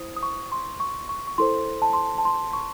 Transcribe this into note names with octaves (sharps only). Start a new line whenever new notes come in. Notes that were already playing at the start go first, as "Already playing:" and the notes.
Already playing: E4 C5 D#6
D#6
C#6
C6
C#6
C#6
C#6
E4 A4 C5 C6
A5
C6
A5
A5
C6
C#6